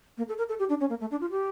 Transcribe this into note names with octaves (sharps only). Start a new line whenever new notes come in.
A#3
A4
A#4
A4
G4
D4
C#4
A#3
A3
D4
F4
G4